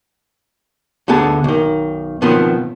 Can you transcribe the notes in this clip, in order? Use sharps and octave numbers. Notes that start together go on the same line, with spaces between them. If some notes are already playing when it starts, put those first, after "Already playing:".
D2 D3 B3 G#4 A5
B1 D#3
B2 D#3 F3 F#3 B3 C4